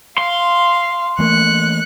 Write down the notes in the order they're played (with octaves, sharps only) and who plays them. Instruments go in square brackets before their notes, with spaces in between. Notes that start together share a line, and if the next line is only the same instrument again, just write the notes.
[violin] F5 [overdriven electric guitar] C6
[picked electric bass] E3 A3 A#3 [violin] F#6 C#7